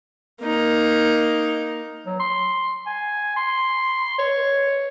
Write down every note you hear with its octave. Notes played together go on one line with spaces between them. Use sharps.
A#3 D#4
F#3
C6
G#5
C6
C#5